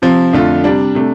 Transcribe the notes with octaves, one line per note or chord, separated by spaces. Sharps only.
C3 F3 C4
F2 D3 A3 F4
C3 G3 D4
C3 A3 D4